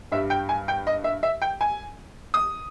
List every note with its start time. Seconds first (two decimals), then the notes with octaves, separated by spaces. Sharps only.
0.12 G2 E5
0.15 G3
0.30 G5
0.49 G#5
0.68 G5
0.87 D#5
1.04 E5
1.23 E5
1.42 G5
1.61 G#5
2.34 D#6